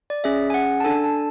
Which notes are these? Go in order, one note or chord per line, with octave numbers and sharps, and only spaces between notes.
D5
C#4 G#4 E5
G#5
F#5
A5
D4 A4 G#5
A5